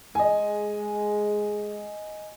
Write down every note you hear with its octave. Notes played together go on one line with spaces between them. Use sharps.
G#3 D#5 G#5